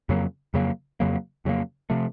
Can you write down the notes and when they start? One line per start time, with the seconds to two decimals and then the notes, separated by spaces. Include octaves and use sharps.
0.09 F2 C#3 F#3 A#3
0.54 F2 C#3 F#3 A#3
1.00 F2 C#3 F#3 A#3
1.45 F2 C#3 F#3 A#3
1.90 C3 F3 A3